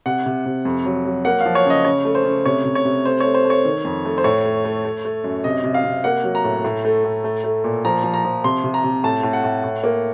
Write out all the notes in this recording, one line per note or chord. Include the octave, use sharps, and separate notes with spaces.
C3 F#5
C3
C3
F2
F#3
F#3
A#3 F#5
F5
F3
C#5
C#3 D#5
C#3 C#5
A3
C5
C#3
C3 C#5
C3
C#5
C3
A3 C5
A3 C#5
C5
A3 C#5
D#3
F2
A3
C5
A2 C#5
A3
A3
A3
A3
F#2
C3 D#5
C3
F5
C3
A#3 F#5
F#3
A#5
A2
A2
A3
A2
A3
A3
A#2
F3 A#5
F3
A#5
F3
C3 C6
C3
A#5
C3
A2 A5
A2
F#5
A2
A2
A#3